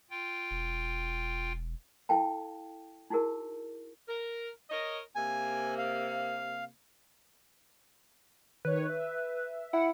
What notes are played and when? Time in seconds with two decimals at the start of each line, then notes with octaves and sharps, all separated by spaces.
0.10 F4 G5
0.51 E1
2.09 E4 A4 F5 G5 A5
3.10 D#4 E4 F#4 G#4 A#4
4.09 A#4
4.70 A#4 C#5 D#5
5.16 C3 A#3 G#5
5.78 F5
8.65 D#3 B4 C#5
8.89 E5
9.73 E4 F#5